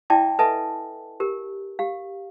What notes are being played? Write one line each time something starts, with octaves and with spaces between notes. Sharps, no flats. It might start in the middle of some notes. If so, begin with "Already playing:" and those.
E4 D5 E5 G5 A5 D6
A4 B4 D#5 E5 G#5 A5
G4 A#4
G4 F5